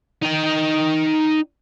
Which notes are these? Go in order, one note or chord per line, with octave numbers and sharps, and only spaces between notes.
D#4 G5